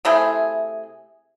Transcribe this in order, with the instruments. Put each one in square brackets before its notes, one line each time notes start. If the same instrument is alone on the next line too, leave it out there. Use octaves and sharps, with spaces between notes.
[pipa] C3 A3 E4 G#4